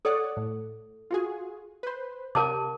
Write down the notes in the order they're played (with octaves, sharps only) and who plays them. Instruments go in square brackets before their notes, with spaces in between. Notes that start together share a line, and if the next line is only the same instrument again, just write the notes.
[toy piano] A4 [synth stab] C#5 D5 F#5
[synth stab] A2
F4 F#4 G#4
B4 C5
[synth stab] C3 G4 [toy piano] A#4 A5 D6